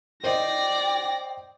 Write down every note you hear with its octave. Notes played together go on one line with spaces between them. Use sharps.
C5 D5 D#5 G5 A#6